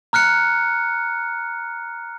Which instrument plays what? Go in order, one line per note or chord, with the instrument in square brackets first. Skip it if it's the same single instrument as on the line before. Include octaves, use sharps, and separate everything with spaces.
[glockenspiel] A#5 F6 F#6 C#7